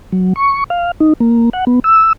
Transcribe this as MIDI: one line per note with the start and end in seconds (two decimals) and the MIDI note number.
0.12 0.33 54
0.36 0.64 85
0.70 0.91 77
1.00 1.13 63
1.20 1.50 58
1.53 1.65 78
1.67 1.79 59
1.84 2.13 88